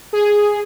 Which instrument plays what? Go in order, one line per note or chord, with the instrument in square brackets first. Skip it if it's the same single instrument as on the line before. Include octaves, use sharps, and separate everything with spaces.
[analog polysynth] G#4